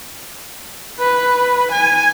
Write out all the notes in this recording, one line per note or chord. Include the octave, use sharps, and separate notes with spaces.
B4
G#5